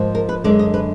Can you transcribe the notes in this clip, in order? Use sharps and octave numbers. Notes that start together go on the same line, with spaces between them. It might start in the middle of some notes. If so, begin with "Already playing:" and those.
Already playing: G#2 F3 A#3
A#4
B4
F#2 D3 G#3 D5
D#5
B4